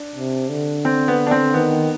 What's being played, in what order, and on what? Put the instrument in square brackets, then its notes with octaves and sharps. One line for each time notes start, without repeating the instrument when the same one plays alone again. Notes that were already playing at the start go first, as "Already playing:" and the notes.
Already playing: [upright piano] D4
[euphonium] C3
D3
[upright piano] C4
B3
D4
C4
[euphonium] D#3 [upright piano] B3